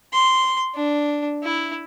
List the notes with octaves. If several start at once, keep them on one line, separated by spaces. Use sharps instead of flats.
C6
D4
E4